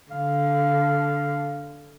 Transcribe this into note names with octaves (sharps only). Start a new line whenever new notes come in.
D3 F5